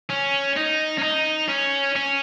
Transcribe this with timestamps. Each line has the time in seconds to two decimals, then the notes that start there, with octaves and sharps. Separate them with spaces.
0.10 C#4
0.56 D#4
0.98 C#4
1.03 D#4
1.49 C#4
1.95 C#4